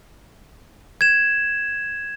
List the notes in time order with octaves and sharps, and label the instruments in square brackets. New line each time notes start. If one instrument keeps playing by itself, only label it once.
[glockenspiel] G#6 E7